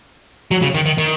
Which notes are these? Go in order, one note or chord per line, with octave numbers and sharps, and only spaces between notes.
F#3
C#3
D#3
D#3
D#3